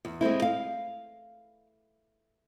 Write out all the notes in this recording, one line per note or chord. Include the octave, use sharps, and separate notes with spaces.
E2
G#3 A3 C4 E4
F5